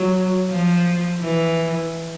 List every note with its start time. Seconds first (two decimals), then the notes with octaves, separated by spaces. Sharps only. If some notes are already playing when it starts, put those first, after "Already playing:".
Already playing: F#3
0.51 F3
1.22 E3